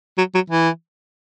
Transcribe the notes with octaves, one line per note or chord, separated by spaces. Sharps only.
F#3
F#3
E3